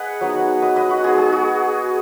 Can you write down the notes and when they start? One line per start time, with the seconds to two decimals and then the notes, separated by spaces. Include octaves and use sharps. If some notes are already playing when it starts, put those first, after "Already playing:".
Already playing: G#4 B4 D#5 F#5
0.21 F#3 B3 D#4
0.62 B4 D#5
0.76 B4 D#5
0.91 F#4
1.04 G#3 B3 D#4 G#4
1.18 G#4
1.32 F#4